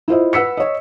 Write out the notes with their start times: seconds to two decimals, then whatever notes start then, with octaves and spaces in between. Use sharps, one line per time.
0.08 E4 F4 C5 D#5 E5
0.33 B4 F#5 E6 B6 C#7
0.57 C#5 D#5